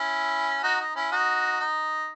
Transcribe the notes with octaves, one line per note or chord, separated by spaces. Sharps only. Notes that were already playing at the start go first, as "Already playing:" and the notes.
Already playing: C#4 E4
D#4 F#4
D#4
C#4 E4
D#4 F#4
D#4